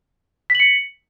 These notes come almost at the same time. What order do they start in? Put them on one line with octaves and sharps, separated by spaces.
B6 F#7 C#7